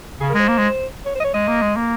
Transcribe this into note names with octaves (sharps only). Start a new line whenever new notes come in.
C#3 G#4
A#4
G#3
C5
A#3
G#3
C#5
C5
D#5
C#5
G#3 D#5
A#3
G#3
A#3